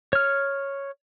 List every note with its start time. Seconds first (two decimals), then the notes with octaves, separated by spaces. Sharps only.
0.13 C#5 F6